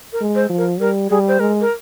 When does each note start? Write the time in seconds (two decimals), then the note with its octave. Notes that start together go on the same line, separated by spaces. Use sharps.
0.13 A#4
0.21 G#3
0.35 C5
0.50 F3
0.58 A#4
0.79 G3 A#4
1.10 G3 G#4
1.28 C5
1.40 G#3 A#4
1.61 A#4